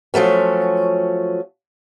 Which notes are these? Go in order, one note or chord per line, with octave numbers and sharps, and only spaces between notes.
F3 F#3 A3 C#4